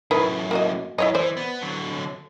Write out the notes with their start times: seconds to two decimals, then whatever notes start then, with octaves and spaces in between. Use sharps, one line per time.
0.11 F#2 A2 D#3 E4 B4
0.51 A#3 F#4 D#5
0.98 F#2 E4 C#5 D#5
1.15 E3 C5 D5
1.37 B3
1.62 D3 F#3